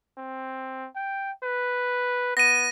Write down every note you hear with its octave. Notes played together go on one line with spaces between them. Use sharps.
C4
G5
B4
B3 A#6 D#7